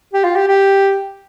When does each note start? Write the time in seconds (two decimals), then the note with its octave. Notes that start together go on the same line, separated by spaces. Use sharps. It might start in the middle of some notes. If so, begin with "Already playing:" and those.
0.13 G4
0.24 F4
0.36 G4
0.48 G4